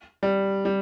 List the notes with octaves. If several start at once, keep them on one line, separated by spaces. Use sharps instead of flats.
G3
G3